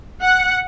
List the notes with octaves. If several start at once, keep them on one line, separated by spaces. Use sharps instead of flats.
F#5